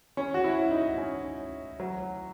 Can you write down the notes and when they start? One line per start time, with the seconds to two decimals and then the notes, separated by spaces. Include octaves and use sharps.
0.17 C#4
0.34 F#4
0.44 E4
0.71 D#4
0.98 C#4
1.80 F#3